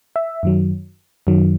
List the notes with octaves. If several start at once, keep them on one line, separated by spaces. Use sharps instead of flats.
E5
F#2 D#3 F#3
F#2 D#3 F#3